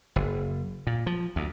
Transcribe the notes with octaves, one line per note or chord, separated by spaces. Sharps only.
F#1
A#2
F3
D2